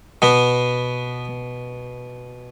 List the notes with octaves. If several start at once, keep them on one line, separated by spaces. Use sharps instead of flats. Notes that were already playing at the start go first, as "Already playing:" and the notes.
B2 B3